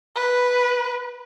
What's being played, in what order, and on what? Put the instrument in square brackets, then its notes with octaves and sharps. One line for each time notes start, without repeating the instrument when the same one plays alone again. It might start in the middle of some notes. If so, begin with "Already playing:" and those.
[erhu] B4